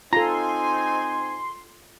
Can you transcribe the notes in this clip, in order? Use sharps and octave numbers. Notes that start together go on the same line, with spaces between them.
C4 D#4 F4 A4 G#5 A#5 C6